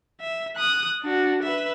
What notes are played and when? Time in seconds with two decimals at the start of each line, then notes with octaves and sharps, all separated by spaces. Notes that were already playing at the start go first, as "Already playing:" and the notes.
0.21 E5
0.56 D#6 F#6
1.02 D4 F#4
1.42 B4 E5